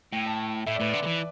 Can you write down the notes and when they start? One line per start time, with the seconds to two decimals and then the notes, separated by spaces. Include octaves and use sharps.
0.12 A2 G5
0.26 A5
0.66 A2 E5
0.75 D5
0.80 A2 B4
0.89 D3 D5
1.03 D3
1.07 E3